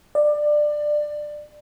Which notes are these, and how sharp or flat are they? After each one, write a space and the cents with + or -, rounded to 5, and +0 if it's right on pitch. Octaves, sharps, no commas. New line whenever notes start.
D5 +20